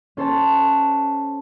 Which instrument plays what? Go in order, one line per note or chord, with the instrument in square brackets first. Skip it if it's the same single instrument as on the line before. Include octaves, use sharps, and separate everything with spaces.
[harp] C#4 A4 C5 C#5 A5